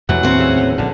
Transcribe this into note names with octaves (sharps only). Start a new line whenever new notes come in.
E2 C3 E3 F#3 A3 F#5
D#2 A2 C4 C#4
C#3 E5
D#2 A2
A#1 A#2 D3